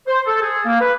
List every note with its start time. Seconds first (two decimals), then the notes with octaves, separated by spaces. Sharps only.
0.06 C5
0.26 A4
0.41 G#4
0.65 A#3
0.80 B4